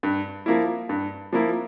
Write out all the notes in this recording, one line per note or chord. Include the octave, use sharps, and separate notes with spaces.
G2
F3 A#3 E4
G2
F3 A#3 E4